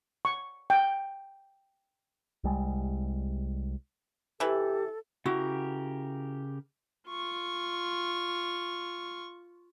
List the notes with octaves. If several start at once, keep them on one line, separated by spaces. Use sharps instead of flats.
C#6
G5
C2 G3 G#3
C3 E3 G4 A4
C#3 E4 F#4 G4 A#4
F4 C#6